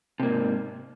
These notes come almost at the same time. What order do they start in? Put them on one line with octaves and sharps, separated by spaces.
C3 A#3 G#2